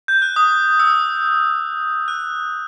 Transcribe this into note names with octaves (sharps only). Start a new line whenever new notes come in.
G6
F#6
D#6
E6
F#6